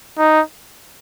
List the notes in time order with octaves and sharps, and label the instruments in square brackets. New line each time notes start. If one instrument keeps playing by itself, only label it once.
[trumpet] D#4